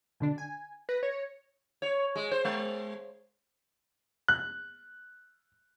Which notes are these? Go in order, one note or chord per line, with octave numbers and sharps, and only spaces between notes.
B2 D3 D4
G#5
B4 A#6
C#5
C#5
G#3
C5
G#3
F#6